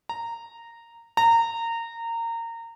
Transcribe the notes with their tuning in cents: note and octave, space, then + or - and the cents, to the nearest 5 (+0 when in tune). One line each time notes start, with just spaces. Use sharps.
A#5 -10
A#5 -20